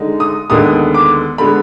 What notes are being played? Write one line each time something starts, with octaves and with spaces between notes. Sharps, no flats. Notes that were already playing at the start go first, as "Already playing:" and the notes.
Already playing: D3 G#3 D#4
D#6
D#2 D3 G#3 B3 D#6
D6
D3 G#3 B3 B5